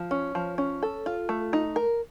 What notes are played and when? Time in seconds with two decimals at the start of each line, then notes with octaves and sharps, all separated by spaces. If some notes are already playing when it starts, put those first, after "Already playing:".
Already playing: F3
0.11 C#4
0.35 F3
0.58 C#4
0.83 A4
1.06 F4
1.29 A3
1.53 D#4
1.76 A#4